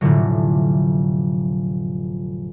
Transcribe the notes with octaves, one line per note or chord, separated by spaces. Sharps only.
F1 A2 D3 F#3